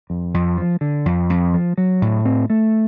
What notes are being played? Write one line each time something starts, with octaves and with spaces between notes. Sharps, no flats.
F2
F2
F3
D3
F2
F2
F3
F#3
A2
C4
A3